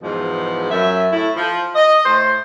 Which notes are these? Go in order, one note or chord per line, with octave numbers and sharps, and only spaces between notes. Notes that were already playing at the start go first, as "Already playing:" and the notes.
E2 G#2 B2 F3
F#2 E5
A2 E4
F3
D#5
A2 C5